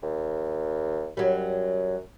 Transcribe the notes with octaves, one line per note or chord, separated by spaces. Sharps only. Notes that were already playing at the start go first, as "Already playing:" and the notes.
D#2
F#2 F#3 G3